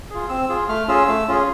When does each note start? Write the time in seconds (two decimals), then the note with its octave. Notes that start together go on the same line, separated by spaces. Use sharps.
0.10 F4 G#4
0.29 C4 E6
0.49 F4 G#4
0.68 A3 F6
0.88 C#4 F4 G#4 E6
1.08 A3
1.28 C#4 F4 G#4